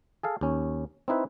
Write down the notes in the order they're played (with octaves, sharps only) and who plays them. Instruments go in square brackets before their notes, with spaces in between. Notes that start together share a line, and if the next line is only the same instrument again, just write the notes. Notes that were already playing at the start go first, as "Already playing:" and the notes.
[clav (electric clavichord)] G#4 A4 F5
D#2 C#4
C4 D#4 E4 B4